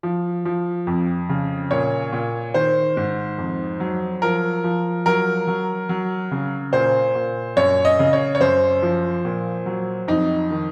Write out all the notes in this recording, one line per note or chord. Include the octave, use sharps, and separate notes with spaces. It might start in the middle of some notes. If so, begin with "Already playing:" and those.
F3
F3
F2
C#3
A#2 C#5
A#2
D#3 C5
G#2
F2
F#3
F3 A#4
F3
F#3 A#4
F#3
F#3
C#3
A#2 C5
A#2
F#2 C#5
D#5
C#3
C#5
C#5
F#2 C5
F3
A#2
F#3
F2 D#4
D#3